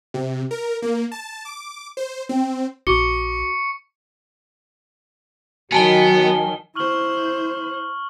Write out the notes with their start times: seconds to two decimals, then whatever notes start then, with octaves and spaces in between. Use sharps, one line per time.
0.14 C3
0.51 A#4
0.82 A#3
1.12 A5
1.45 D6
1.97 C5
2.29 C4
2.87 A#1 F#4 C#6 D6 C#7 G7
5.72 D#3 F#3 B3 F#4 G#5 A5 G7
6.75 E4 C5 C#6 F6 F#7